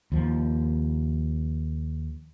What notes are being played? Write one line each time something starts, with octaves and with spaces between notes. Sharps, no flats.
D#2 F3